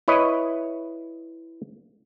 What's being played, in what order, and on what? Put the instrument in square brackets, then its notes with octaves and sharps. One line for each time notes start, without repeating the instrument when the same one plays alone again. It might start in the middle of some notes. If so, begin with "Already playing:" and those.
[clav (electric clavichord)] E4 B4 C#5 D#5